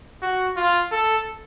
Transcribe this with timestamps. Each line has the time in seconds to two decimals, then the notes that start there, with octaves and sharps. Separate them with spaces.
0.22 F#4
0.57 F4
0.92 A4